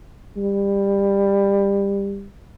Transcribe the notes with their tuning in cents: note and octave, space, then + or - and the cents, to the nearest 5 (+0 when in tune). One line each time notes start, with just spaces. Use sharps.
G3 +20